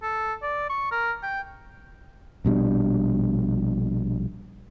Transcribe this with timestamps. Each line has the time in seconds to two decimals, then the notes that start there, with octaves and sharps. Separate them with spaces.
0.03 A4
0.42 D5
0.70 C#6
0.92 A#4
1.23 G5
2.45 A#1 B2 G3 D4